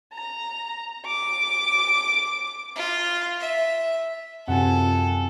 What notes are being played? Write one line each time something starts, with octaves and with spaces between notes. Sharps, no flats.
A#5
D6
F4
E5
F#2 C3 F4 A4 F#5 G#5